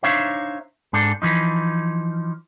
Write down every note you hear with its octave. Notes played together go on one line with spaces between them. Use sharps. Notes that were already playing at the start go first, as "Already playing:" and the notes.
D4 D#4 C5 C#5 E5 F5
G#2 D4 A4
E3 F3 D#4